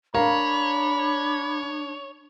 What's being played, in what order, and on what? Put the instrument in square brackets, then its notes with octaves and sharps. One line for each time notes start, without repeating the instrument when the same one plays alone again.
[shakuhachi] D4 [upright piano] A#4 F5 A#5 [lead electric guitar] C#5 [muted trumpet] B5